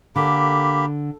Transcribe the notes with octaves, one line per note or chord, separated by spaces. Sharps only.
D3 A#3 G4 B5